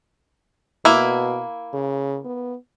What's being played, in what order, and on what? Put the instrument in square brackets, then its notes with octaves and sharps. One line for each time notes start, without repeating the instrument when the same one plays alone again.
[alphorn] B2 [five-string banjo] A#3 E4
[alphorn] C#3
B3